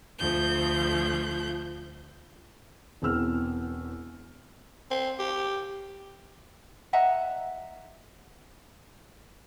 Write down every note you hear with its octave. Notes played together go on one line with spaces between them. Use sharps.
D2 F3 G6
E1 E2 C4 E6 F6
C4
G4
D#5 E5 F#5 A#5